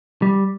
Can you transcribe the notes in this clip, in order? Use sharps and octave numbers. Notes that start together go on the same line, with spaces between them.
G3